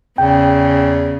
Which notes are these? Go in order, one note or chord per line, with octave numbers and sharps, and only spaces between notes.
E2 C#3 G5